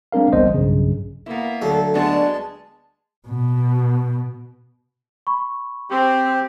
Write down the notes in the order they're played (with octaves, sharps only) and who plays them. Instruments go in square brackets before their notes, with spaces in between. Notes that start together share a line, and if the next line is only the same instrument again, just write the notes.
[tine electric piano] G#3 C4 D4 A#4 F5
G1 C2 E3 B3 C5 D#5
B1 G2 C#3
[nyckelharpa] A#3 A#4 [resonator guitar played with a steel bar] B3 E4
[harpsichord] D2 F#3 [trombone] A4
[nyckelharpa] G#3 A5 [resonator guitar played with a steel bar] A3 D4 F#4 [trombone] B3
[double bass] B2
[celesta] B5 C#6
[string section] C4 [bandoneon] G4